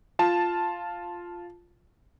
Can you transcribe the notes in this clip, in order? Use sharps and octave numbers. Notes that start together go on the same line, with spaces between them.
F4 A5